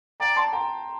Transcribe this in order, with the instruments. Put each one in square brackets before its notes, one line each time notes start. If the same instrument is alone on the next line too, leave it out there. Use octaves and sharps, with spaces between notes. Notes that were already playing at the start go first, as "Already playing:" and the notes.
[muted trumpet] D5 [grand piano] G5 A#5
[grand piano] A5 C6
G5 A#5